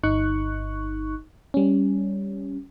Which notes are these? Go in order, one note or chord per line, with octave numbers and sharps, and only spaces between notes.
G1 D#4 C#6 F#6
G3 C#4